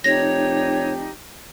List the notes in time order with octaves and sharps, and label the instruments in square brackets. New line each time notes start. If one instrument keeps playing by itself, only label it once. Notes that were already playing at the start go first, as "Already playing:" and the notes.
[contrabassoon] F1 [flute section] D4 D#4 G4 [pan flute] C#5 [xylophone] A#6